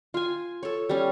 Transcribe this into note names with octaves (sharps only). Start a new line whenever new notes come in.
F4 G#5
A4 C#5
G3 C#4